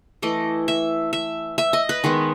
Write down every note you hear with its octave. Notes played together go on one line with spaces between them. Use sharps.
E3 A3 D#5
E5
E5
E5
D#5
B4
D#3 G#3 B3